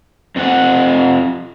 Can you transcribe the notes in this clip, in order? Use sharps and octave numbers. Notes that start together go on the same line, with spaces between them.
F2 F#5